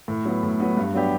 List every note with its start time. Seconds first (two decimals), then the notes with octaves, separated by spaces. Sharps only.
0.08 A2
0.25 F#3 B3
0.43 A2
0.60 F#3 B3
0.77 G2
0.94 F#3 B3 D4 G4